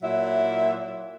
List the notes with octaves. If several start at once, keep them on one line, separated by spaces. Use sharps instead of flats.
A#2 F#3 E4 E5